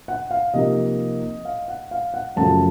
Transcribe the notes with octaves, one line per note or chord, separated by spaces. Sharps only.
F#5
F5
C3 F3 A#3 D#4 D#5
F5
F#5
F5
F#5
F#2 C#3 F3 A3 A5